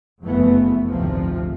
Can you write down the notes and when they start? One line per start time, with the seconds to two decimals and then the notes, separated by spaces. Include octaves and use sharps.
0.24 F#1 F2 E3 A3 B3
0.90 G#1 D2 C3 F3